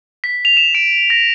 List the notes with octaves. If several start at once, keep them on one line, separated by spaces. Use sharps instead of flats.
B6
F7
E7
D7
A#6